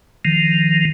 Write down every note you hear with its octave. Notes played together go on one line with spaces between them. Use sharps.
D#3 F3